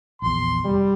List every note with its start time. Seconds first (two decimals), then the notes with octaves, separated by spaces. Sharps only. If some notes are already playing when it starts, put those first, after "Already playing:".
0.22 A#1 E2 C6
0.64 F1 G3